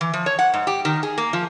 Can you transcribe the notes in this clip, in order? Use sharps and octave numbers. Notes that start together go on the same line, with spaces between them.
E3
F3
C#5
F#5
G#2
G4
D#3
G#4
A#3
F3